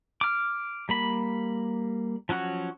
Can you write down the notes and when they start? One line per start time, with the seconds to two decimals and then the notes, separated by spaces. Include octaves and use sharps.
0.21 D6 F6
0.89 G3 A#3 B5
2.29 F3 F#3 C#4 F#4 C#5